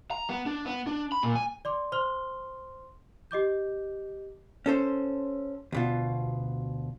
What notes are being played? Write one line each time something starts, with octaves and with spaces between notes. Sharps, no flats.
A#5
B3
D4
B3
D4
B5
A#2
G#5
D5 C6 D6
C5 C6 F6 G7
G4 D#5 D6 G6
C#4 A4 C5
D2 B2 F4